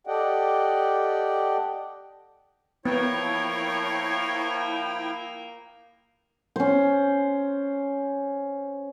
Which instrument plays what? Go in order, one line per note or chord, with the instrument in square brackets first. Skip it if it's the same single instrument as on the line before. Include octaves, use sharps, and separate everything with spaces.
[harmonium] G4 A4 D5 D#5 F#5 G5
[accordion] F3 E4 G5 [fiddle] A#3 A#4 [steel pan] B3 [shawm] C#5
[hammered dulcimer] C#4 C5